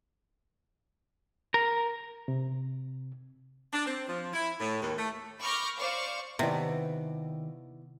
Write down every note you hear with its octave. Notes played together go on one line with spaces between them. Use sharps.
A#4
C3
D4
C4
F3
E4
A2
D#2
A3
B5 C#6 D6 F6 G6 A#6
C5 D5 F5 C#6
D#2 C3 B3 E4 D5